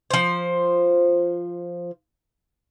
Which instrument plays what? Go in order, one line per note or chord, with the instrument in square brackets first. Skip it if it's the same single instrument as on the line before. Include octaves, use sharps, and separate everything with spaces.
[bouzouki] F3 C5